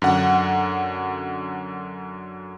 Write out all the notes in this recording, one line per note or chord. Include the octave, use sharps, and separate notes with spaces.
F#2 D3 F#5